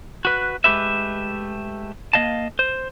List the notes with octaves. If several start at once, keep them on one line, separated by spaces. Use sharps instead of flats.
F#4 B4
G#3 A3 G4 B4 E5
A#3 C4 D#5 F5 A5
C5